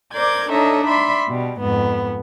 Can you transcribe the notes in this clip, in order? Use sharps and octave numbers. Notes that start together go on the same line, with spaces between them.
A#4 C5 D5 D6 G6 G#6
D4 D#4 A4 C#5 D#5 E5
D5 E5 B5 C6
B2 G3
F2 G#2 B3